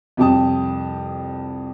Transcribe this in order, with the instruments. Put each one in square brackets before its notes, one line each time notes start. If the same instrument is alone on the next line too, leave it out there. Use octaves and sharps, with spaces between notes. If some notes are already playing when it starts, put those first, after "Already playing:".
[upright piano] C2 F2 G4 G5 A5 D#6